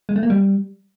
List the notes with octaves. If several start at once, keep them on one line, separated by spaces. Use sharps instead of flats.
G#3
A3
A#3
G3